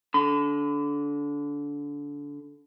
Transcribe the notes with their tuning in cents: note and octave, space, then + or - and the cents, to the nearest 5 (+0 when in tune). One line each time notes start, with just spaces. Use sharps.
D3 -25 B5 +45